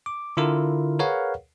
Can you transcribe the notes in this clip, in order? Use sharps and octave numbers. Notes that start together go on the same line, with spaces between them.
D6
D3 E4 F4 A#4
G#4 A#4 B4 C#5 F5 F#5